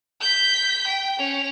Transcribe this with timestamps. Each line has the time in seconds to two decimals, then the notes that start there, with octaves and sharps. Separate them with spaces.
0.21 G6 B6
0.87 G5
1.19 C#4 F7